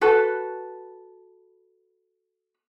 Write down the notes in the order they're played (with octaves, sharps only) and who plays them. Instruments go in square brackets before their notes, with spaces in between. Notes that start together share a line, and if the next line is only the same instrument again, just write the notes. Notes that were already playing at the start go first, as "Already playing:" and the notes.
[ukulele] F#4 A4 B4